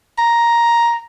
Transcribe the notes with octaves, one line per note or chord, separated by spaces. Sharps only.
A#5